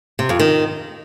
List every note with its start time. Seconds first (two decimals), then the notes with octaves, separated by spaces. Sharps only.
0.19 C3
0.29 F2
0.39 D#3